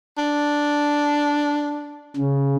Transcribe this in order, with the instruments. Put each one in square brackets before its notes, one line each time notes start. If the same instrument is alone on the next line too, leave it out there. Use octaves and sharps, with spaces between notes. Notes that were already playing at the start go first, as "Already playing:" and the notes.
[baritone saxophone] D4
[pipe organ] C#3